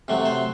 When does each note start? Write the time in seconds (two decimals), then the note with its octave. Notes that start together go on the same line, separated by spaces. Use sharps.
0.08 C3 F#3 A3
0.25 C5